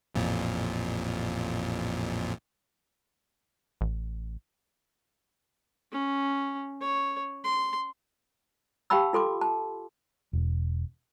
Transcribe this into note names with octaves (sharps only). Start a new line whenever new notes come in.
A1 F2 A#2
A1
C#4
C#5
C6
G4 F5 G5 A5 B5 E6
F4 A4 C6 D6
A5
E1